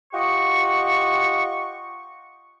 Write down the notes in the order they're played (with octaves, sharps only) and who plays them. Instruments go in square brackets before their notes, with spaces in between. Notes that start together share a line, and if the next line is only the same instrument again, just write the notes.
[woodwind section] F4 G4 D#5 F#5 C#6